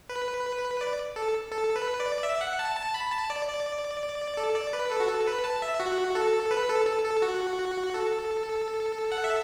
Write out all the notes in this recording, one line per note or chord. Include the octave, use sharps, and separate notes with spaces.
B4
D5
A4
A4
B4
D5
E5
F#5
A5
A5
B5
A5
D5
D5
A4
D5
B4
A4
F#4
A4
B4
A5
E5
F#4
A4
B4
A4
A4
A4
F#4
A4
F#5
E5